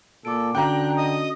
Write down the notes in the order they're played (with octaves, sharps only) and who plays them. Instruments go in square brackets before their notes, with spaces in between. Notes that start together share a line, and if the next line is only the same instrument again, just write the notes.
[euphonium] A#2 [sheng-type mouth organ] A4 [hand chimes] D6 D7
[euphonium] D3 [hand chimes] C#4 F#4 [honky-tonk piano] G5 A#5 [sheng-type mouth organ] F#6
[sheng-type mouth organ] D#5 D#6